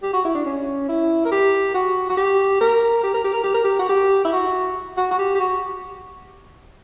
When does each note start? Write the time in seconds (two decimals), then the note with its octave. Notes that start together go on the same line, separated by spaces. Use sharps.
0.03 G4
0.14 F#4
0.25 E4
0.35 D4
0.45 C#4
0.89 E4
1.25 A#4
1.31 G4
1.74 F#4
2.10 F#4
2.17 G4
2.61 A#4
3.03 G4
3.14 A#4
3.24 G4
3.34 A#4
3.44 G4
3.54 A#4
3.64 G4
3.79 F#4
3.89 G4
4.25 E4
4.33 F#4
4.97 F#4
5.11 F#4
5.19 G4
5.35 G4
5.40 F#4